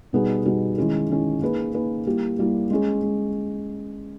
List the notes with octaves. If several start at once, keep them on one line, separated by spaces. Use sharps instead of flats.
B2 G3 B3 D#4 G#4
B2 G3 B3 D#4 G#4
D#3 G#3 C#4 E4 G#4
D#3 G#3 C#4 E4 G#4
A#3 D#4 G#4 B4
A#3 D#4 G#4 B4
G3 A#3 E4 G4
G3 A#3 E4 G4
G#3 C#4 G#4
G#3